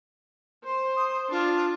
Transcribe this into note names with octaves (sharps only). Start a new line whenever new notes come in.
C5
D#6
D4 F4